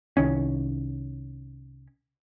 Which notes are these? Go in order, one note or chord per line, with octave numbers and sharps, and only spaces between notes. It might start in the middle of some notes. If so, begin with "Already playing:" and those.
C2 D#3 C#4